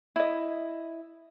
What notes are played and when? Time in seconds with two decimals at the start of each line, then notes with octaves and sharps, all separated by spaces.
0.16 E4 D#5